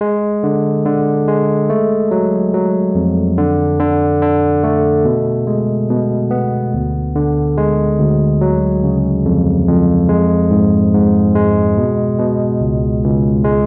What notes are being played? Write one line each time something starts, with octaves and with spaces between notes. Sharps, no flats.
G#3
D3
D3
G#3
A3
F#3
F#3
F2
D3
D3
D3
A3
B2
G#3
B2
B3
D2
D3
G#3
D2
F#3
C#3
F2
F2
G#3
G#2
G#2
G#3
B2
B2
C#2
C#2
G#3